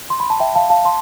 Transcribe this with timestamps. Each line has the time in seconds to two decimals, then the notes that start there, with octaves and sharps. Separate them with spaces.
0.10 C6
0.20 B5
0.30 A5
0.40 E5 G5
0.55 F5 A5
0.70 F5 A5
0.85 A5 C6